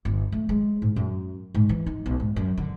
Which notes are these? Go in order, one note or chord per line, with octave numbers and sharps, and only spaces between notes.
G1
A3
G#3
G#2
F#2
G#2
E3
D#4
B1
G#2
F#2
D3